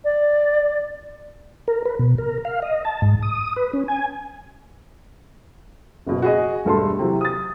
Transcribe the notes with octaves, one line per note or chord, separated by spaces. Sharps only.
D5
A#4
B4
B2
A#4
F5
D#5
A5
G#2
D#6
B4
C#4
G#5
F#1 B2
F#4 G#4 D#5
E1 G2 A3 A4 B5 C6
C3 E3 F#3
D#6 A6